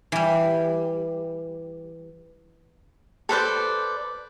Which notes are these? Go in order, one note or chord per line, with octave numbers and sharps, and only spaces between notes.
E3 G3
A4 B4 C5 D5